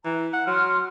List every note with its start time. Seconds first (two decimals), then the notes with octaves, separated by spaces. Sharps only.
0.05 E3 A#5
0.33 F#5
0.47 F#3 C6 F6